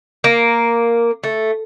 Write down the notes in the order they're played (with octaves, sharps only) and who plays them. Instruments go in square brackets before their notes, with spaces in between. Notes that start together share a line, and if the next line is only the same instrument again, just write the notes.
[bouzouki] A#3
A3